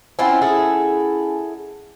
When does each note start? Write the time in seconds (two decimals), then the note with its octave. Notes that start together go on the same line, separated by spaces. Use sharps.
0.19 C4 C#4 E4 F4 F#5 G#5
0.41 E4 G#4 A4